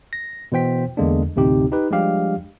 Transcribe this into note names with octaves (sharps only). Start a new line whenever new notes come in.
A#6
B2 E3 C5 G5 B6
E2 D3 G#3 A#3 D4
A1 D2 C3 D#4 G4
D#4 G4 B4
F3 G3 G#3 D4 G4 F5